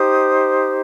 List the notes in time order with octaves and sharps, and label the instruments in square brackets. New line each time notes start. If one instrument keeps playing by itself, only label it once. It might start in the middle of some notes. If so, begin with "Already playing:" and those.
Already playing: [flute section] D#4 G4 C5 D#6